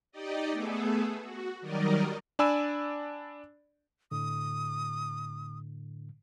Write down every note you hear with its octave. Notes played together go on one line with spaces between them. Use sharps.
D#4 G4 D5 D#5
A3 B3 G#4 A4
F#4
D#3 F#3 G3 A#4 D5 D#5
D4 D5 G#5 B5 E6 E7
A2 D3 D#6